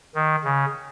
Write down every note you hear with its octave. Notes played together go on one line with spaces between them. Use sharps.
D#3
C#3